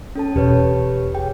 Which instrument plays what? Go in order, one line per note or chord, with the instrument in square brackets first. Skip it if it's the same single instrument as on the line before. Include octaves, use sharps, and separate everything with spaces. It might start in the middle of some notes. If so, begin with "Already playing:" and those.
[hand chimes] C#4 A4 A5
[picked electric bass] E1 [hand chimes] G4 B4 C#5
[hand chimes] G#4 G5